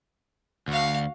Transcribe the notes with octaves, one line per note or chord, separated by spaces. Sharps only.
D2 F#4 F5